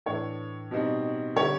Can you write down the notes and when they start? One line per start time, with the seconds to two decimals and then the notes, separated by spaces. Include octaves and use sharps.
0.06 A2 E3 A3 D4 C#5
0.71 B2 G3 C4 D#4
1.36 D3 G3 C#5